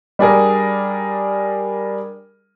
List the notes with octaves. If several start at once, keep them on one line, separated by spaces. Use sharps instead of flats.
G3 D4 G#4 A#4